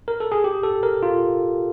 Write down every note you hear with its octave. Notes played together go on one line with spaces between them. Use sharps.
A#4
A4
G#4
G4
A4
A#4
F4